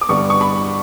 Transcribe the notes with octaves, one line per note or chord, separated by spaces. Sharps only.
D6
G2 D3 G3 B3 D4 C#6
C#6
B5